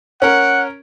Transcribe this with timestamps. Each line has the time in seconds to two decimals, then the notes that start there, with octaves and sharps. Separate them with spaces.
0.22 C#4 A#4 F#5